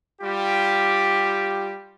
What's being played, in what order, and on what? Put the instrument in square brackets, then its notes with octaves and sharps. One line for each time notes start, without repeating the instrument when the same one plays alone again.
[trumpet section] G3 F4 G4